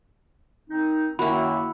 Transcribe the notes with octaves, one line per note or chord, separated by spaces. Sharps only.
D#3 C4 D#4
F#2 D#3 A#3 E4 F#4 B5